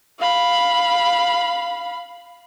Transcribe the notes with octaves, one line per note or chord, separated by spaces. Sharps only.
F5 B5